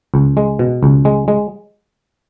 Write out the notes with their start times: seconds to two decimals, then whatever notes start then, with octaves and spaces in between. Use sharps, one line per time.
0.14 C#2
0.37 G#3
0.59 B2
0.83 C#2
1.05 G#3
1.28 G#3